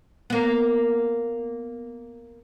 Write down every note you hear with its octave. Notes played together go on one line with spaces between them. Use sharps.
A#3 B3